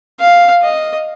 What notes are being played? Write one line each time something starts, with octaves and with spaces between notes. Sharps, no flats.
F5
D#5